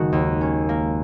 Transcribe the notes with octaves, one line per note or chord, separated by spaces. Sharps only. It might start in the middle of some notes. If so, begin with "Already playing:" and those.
Already playing: F#1 D#3 G#3 F#4
D#2
C#4
A#3